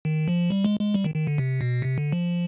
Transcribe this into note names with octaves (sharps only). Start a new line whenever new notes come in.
D#3
F3
G3
G#3
G#3
G3
D#3
D#3
D3
C3
B2
C3
D3
F3